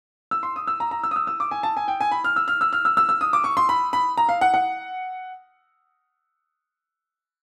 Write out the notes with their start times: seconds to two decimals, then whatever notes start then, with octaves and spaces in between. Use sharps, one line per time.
0.31 E6
0.43 C6
0.56 D#6
0.67 E6
0.80 A#5
0.91 A#5
1.03 E6
1.11 D#6
1.16 E6
1.27 E6
1.40 D6
1.51 G#5
1.63 A5
1.77 G#5
1.88 G5
2.01 G#5
2.12 B5
2.24 F6
2.36 E6
2.48 F6
2.61 E6
2.73 F6
2.85 E6
2.97 E6
3.09 E6
3.21 D#6
3.33 D6
3.44 C#6
3.57 C6
3.69 B5
3.93 B5
4.18 A#5
4.29 F5
4.41 F#5
4.54 F#5